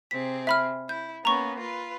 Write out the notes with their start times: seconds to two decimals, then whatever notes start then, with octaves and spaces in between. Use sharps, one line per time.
0.11 C3 C4 G#4 B6
0.47 E5 B5 F6
0.89 E4 G6
1.25 A#3 B3 C#4 A#5 C#6
1.58 F4 B4